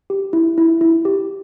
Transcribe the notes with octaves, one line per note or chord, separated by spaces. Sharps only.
G4
E4
E4
E4
G4